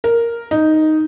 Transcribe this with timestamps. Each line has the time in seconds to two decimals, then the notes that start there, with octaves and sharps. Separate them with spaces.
0.04 A#4
0.51 D#4